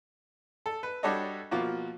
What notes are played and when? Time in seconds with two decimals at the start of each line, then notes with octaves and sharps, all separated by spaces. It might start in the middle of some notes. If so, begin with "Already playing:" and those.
0.66 A4
0.83 B4
1.03 G3 D4 F#4 A4 C#5 D#5
1.51 B2 F3 A#3 F4 F#4